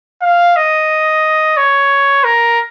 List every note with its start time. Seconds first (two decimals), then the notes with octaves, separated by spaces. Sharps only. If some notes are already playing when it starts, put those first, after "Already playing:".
0.22 F5
0.56 D#5
1.57 C#5
2.24 A#4